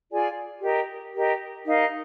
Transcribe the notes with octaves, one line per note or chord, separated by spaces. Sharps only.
F4 G#4 D5 G#5
G4 A#4 D#5
G4 A#4 D#5
D#4 A#4 F5